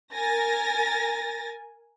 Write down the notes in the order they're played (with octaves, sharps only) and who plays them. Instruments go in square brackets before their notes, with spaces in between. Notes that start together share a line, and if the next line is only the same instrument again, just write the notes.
[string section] A#4 G#5 A6 A#6